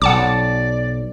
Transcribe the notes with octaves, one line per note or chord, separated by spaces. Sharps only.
B1 D5 F#5 A5 D6